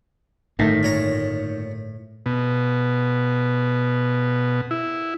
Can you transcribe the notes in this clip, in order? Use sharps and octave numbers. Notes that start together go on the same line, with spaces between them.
G1 A2 D#3 A3
A#2 C#5 A#5
B2
E4